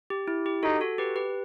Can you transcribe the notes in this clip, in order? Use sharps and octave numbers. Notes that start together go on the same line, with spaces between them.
G4
E4
G4
D#4 F#4 A4
F#4 A4
G4 B4
G4 B4